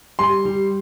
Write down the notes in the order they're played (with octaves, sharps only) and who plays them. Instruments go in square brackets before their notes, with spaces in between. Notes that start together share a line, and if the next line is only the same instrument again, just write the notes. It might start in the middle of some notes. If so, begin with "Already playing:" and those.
[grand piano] G3 C6
G3